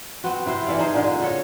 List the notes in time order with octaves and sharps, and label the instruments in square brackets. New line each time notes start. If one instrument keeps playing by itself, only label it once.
[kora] B3 C4 F#4
C3 E4 C5
E3 A4 D5 F5
D#4 G#4 C5
A#2 D3 G#3
F#4 A4 C#5